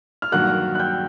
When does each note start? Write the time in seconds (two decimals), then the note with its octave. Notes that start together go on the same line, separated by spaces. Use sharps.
0.22 F6
0.32 G2 D#3 F#3 A#3 F#5 F#6
0.75 F#6
0.80 G5 G6